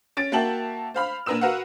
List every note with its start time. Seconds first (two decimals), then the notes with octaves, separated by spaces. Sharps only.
0.17 C#4 A6 D7
0.32 A#3 F#4 E5 G5 A5 F#7
0.94 C5 F5 B5 F6
1.26 A#2 D4 A#4 B4 E6 E7
1.41 F#4 A#4 B4 F5 F#5